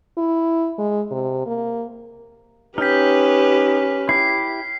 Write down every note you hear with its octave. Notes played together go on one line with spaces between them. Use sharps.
E4
G#3
C3
A#3
C#4 D#4 G4 B4 G5 F6 B6
E4 G4 C7